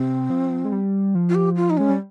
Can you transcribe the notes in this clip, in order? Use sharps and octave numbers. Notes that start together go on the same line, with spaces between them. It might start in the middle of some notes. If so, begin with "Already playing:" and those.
Already playing: C3 C4
F3
G#3
G3
F3
F4
G4
F4
D#4
G#3 C#4
G3